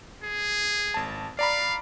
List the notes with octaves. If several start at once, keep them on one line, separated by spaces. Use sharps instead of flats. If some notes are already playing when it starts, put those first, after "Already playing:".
G#4
G#1 A5
D5 F5 A#5 B5